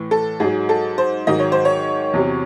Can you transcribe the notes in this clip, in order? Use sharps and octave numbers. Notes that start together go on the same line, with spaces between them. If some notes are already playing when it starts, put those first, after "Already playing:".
Already playing: A2 E3
A4
G#2 F#3 G#4
A4
C5
G#2 D#3 F#3 D#5
C#5
C5
C#5
E2 C3 F#3